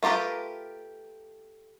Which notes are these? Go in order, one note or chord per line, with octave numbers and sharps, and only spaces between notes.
A3 F4 G4 A#4 B4